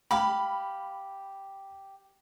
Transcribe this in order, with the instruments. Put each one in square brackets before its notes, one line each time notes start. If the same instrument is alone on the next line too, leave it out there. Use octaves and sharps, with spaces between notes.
[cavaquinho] G4 F5 [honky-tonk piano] B5